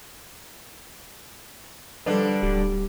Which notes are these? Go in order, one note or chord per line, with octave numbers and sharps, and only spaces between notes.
D3 F3 G3 D4 A4 B4
D1 G4